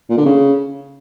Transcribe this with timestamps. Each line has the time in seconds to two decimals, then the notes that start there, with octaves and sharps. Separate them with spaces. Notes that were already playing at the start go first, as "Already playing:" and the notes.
0.09 A#2
0.17 D3
0.25 C#3